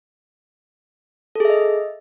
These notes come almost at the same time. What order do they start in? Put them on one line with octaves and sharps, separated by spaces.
A4 G#4 E5 D#5